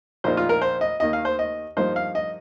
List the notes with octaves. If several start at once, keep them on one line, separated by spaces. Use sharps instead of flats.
A#1 A#2 A#3 D#4 C5
F4
A#4
C5
D#5
D#2 D#3 A#3 D#5
F5
C5
D#5
G2 F3 A#3 D#4 C5
F5
D#5